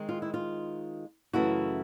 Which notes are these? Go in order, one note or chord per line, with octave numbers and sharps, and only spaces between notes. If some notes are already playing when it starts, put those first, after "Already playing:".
Already playing: D#3 G#3 C4
F4
E4
F4
F#2 C#3 E3 A3 E4 F#4